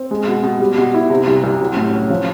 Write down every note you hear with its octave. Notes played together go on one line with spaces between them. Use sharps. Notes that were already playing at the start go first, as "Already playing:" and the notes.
Already playing: C4
G#3
B2
B2
G3
B2
E4
C3
C2
C2
F#3
A2
C#4
F3